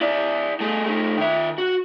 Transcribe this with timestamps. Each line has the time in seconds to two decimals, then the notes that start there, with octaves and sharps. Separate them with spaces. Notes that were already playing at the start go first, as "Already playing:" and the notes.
0.01 E4 D5
0.61 A3 G#4
0.86 A3 D#4
1.18 D#3 E5
1.58 F#4